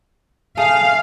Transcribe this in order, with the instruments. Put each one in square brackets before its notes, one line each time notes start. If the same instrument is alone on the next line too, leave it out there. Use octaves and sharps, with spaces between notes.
[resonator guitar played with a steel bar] A3 G#4 [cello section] F5